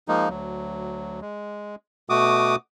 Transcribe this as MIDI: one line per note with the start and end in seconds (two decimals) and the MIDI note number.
0.08 0.29 53
0.08 0.29 56
0.08 0.29 58
0.08 0.29 63
0.29 1.20 38
0.29 1.20 54
1.22 1.75 56
2.10 2.56 47
2.10 2.56 57
2.10 2.56 66
2.10 2.56 86
2.10 2.56 87